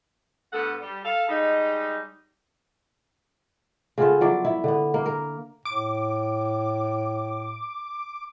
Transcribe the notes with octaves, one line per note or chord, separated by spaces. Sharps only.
G2 A3 B3 A4 F#5
G3
A4 F5
G3 G#3 D#4
C#3 B3 F4 A4
F3 F#3 D5 E5
E4
D3 B3
A#3
A#4
A2 D6